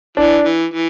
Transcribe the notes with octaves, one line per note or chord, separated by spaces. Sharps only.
E3 D4
E3
E3